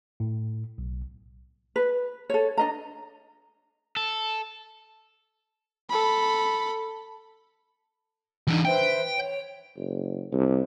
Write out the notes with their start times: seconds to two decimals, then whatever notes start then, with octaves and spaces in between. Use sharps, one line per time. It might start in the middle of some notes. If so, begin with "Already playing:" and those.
0.20 A2
0.78 B1
1.76 B4
2.30 A4 C#5
2.57 D4 D#5 A#5
3.97 A4
5.90 A4 B5
8.47 E3 D4 D#4
8.65 B4 C5 E5 G5
9.16 C#5
9.77 F#1
10.32 C2